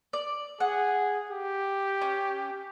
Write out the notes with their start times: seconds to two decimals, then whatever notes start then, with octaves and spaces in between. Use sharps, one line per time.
0.13 D5
0.60 G#4 F#5
1.31 G4
2.02 C#4